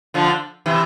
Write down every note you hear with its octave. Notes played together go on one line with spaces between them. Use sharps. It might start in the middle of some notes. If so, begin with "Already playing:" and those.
D3 F3
C3 E3